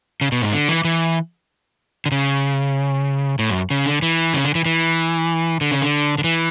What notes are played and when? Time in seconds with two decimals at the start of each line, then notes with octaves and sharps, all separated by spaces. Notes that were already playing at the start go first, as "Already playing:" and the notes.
0.21 C#3
0.32 B2
0.42 G#2
0.53 D3
0.69 E3
0.84 E3
2.06 D3
2.12 C#3
3.39 A2
3.50 F#2
3.70 C#3
3.86 D3
4.02 E3
4.34 C#3
4.45 D3
4.55 E3
4.66 E3
5.61 D3
5.71 C#3
5.82 D3
6.18 D3
6.24 E3